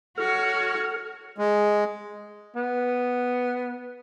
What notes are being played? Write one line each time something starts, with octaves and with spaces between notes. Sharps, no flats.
F#4 A4 C#5 F6
G#3
B3